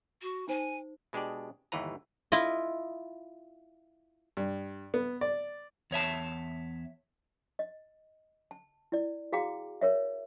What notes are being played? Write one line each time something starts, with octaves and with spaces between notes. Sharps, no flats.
F#4
D#4 C5 G#5
B2 G#3 D4 G4 D5
G1 D#2 E3 B4 A#5
E4 F4 D#5
G2
B3
D5
E2 C#5 E5 A5
D#5
A5
E4 D5
F#4 G#4 F5 G5 A#5 D6
A#4 C#5 E5